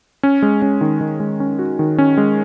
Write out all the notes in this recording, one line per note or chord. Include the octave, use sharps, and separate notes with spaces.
C#4
G#3
C#4
D#3
D#3
G#3
C#4
F#4
D#3
C#4
G#3